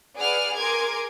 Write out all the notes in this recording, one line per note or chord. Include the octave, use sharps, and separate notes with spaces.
G#4 B4 D5 F#5 F6
G#4 A#4 C6 D6 G#6